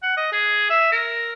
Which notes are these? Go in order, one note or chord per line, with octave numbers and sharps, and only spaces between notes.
F#5
D#5
G#4
E5
A#4